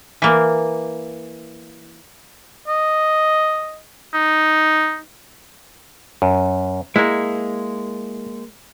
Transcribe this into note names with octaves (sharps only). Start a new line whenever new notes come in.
E3 A#3
D#5
D#4
F#2
G#3 A#3 E4